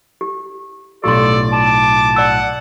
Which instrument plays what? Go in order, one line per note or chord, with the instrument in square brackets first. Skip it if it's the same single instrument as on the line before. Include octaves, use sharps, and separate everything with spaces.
[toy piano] G4
[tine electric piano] B1 A2 F4 [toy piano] G4 C6 [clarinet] A4 [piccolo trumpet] D5
[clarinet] A5 [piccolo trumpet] D6
[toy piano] D5 E6 [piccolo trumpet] F#5